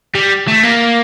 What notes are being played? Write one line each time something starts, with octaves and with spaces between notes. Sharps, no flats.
G3
A3
A#3